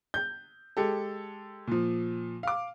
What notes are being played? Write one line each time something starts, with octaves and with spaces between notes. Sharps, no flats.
G6
G#3 G4 A4
A#2 F3
F5 D6